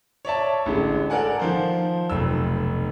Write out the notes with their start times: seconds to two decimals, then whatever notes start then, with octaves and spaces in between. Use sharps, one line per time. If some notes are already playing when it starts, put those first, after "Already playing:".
0.25 C#5 D5 E5 A5
0.66 A1 D3 G#3
1.10 A4 A#4 D5 F#5 G#5
1.39 D#3 F3 C5
2.10 F1 B1 E6